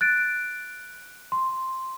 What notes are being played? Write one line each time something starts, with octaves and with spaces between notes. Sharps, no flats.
F#6 A6 D7
C6